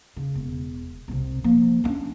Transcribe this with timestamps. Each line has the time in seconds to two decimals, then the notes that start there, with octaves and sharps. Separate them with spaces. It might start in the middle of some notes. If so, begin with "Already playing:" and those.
0.17 C#3
0.35 E1
1.08 C2 C3
1.44 F3 A#3
1.84 C#4 D4